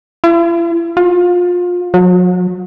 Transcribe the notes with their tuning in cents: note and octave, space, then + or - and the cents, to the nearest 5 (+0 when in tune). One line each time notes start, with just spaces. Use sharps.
E4 +45
F4 +25
F#3 -40